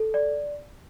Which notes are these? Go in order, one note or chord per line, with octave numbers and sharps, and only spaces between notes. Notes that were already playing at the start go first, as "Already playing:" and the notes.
Already playing: A4
D5